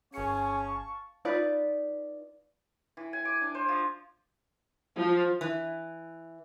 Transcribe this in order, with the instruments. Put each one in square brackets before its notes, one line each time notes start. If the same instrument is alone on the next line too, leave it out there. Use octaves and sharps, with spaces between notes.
[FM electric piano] G1 C#7 [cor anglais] C#4 [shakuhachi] G#4 [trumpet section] F5 A5 C#6
[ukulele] D#4 F4 B4 D5
[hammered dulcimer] E3
G#5
D6
D4
C5
F3
[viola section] F3
[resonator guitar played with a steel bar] E3